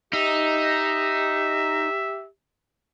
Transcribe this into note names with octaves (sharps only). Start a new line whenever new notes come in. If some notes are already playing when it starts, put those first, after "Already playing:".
D#4 G4 E5